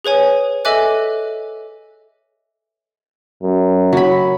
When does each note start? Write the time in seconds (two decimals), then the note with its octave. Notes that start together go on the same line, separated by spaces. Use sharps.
0.05 G#4 B4 C#5 G#5
0.65 A4 D#5 E5 G#5 D6 F#6
3.43 F#2
3.93 F#3 B5